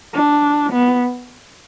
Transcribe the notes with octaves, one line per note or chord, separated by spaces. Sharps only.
D4
B3